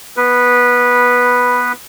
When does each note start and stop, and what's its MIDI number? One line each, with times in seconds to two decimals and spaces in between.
0.17 1.72 59
0.17 1.72 71